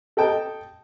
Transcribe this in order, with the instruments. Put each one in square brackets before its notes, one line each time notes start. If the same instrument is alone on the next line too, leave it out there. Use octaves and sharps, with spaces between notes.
[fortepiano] A4 D#5 G5 A5